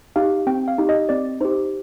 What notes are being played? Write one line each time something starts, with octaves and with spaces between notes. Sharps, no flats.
D#4 G4 F5
C4 G5
F5
D#4 G4
D#5
C4 D5
D#4 G4 C5